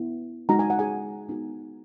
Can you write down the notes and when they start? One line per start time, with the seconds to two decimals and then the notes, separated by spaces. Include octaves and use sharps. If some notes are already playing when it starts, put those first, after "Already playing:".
Already playing: B3 E4
0.49 G#3 D#4 F#4 A#5
0.59 G#5
0.70 F#5
0.79 G#4 G#5
1.29 B3 D#4 F#4